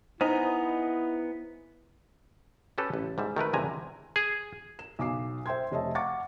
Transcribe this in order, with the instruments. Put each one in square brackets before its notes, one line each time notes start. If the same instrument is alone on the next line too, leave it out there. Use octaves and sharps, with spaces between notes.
[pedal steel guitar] B3 G#5 A#5 [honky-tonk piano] D#4 [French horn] E4 [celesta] C5
[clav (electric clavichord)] C#4 G4 A4 B4
A1
G#2 G3 E5
D#3 A3 A#4 B4
E2 G2 C3 G#5 A#5
G#4
[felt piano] E7
B1 G#5 D6 C7
C5 E5 G5 C6 G#6
F1 C#5 D#5 E5 A5
F5 F#5 C#6 D6 A6 C#7